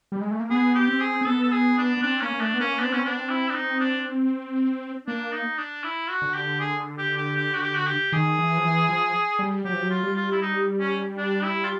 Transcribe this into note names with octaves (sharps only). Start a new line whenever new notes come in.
G3
G#3
A3
A#3
B3 G#4
G4
C4
G#4
C4
B3 A4
A4
G#4
D4
B3
C4 D4
A#3 C#4
A#3
A3 D4
B3
A#3 C#4
B3 D4
C4
B3 C#4
C4
B3 D4
C4
E4
D4
C4 D#4
D4
A#3 D4
D#4
D4
E4
F#4
D3
G4
G#4
G4
G4
G4
F#4
G4
F#4
G4
D#3 G#4
E3
F3
E3
F3
G3
F#3 G4
F3
F#3
F4
G3
F4
E4
D#4
C#4
D4
E4
F4